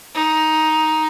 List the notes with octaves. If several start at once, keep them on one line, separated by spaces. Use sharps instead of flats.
D#4